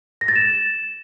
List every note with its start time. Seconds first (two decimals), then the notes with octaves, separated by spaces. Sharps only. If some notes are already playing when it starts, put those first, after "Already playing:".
0.21 A#6
0.28 A6
0.36 E7